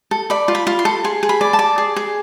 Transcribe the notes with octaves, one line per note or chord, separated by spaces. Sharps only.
A4
D5 B5
F4
B5
F4
C6
A4
G#4 C6
G#4
B5
D5
A5
D5
G#4
G#4